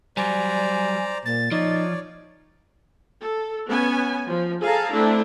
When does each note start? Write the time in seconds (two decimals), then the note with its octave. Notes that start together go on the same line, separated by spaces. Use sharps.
0.17 F#3 G3 C5 D5 G#5 A#5
1.25 A#2 A6
1.51 F3 D#4 C#5 D5
3.20 A4
3.68 B3 C#4 G#5
4.29 F3
4.62 G#4 A4 F5 A5 A#5
4.92 A3 C4 D4 E4